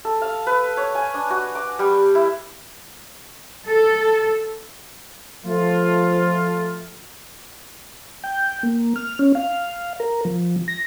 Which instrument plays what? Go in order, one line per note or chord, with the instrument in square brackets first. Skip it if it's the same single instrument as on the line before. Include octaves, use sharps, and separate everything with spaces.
[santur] A4
F5
B4
C#5
G#5
D4
F#4
D6
G3
E4
[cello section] A4
[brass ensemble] F3 A3 F4
[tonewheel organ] G5
A#3
F6
C#4
F5
A#4
F3
A#6